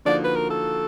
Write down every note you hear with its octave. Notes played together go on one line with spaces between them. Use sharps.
D3 F3 A#3 D#4 F#4 D5
B4
A#4
A4